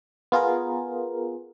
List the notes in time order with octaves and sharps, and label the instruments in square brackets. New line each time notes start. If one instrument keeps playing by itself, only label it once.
[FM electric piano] B3 F4 G#4 A#4